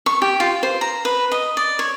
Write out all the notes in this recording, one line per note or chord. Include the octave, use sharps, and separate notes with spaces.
C#6
G4
F4
C5
A#5
B4
D#5
D5
C#5